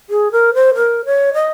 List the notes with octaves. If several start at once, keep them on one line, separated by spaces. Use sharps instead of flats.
G#4
A#4
C5
A#4
C#5
D#5